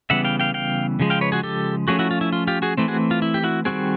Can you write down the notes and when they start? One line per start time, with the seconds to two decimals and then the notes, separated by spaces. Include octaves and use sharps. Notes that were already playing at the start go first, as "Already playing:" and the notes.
0.10 C#3 E3 G3 B3 E5 F#5
0.24 F5 G5
0.40 F5 G5
0.54 F5 G5
0.99 C#3 F3 G#3
1.10 F5 G5
1.21 B4 C#5
1.32 F#4 G#4
1.43 G4 A4
1.88 F3 A3 C#4 F#4 G#4
1.99 E4 F#4
2.11 F4
2.21 E4
2.33 F4
2.47 F4 G4
2.62 F#4 G#4
2.77 E3 A3 C4
2.88 F#4 G#4
3.11 F4
3.22 E4
3.34 G4
3.44 E4 F#4
3.65 D#3 G3 C4 F#4 G#4